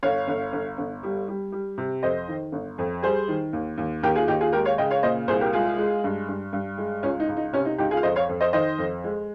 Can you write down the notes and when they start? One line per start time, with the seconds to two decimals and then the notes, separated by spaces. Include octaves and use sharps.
0.03 G1 C#5 F5
0.28 G1
0.53 G1
0.78 G1
1.03 G3
1.28 G3
1.52 G3
1.78 C3
2.03 F2 C5 D#5
2.28 D#3
2.52 G1
2.78 F2
3.03 G3 G#4 C5
3.28 D#3
3.53 D#2
3.77 D#2
4.03 D#2 G4 A#4
4.15 F4 G#4
4.28 D#2 D#4 G4
4.41 F4 G#4
4.53 G#3 G4 A#4
4.65 C#5 F5
4.78 C#3 D#5 G5
4.91 C#5 F5
5.03 A#2 C5 D#5
5.28 C2 G#4 C5
5.41 G4 A#4
5.53 G#3 F4 G#4
5.78 G#3
6.04 G2
6.28 G2
6.53 G2
6.78 G#3
7.03 C#2 C#4 F4
7.20 D#4
7.28 C#2
7.37 D#4
7.53 C3 C#4
7.65 D#4
7.78 C#2 D#4 G4
7.91 F4 G#4
7.97 F5
8.03 F2 C5 D#5
8.16 C#5 F5
8.29 F2
8.41 C5 D#5
8.53 D#3 C5 D#5
8.78 F2
9.04 G#3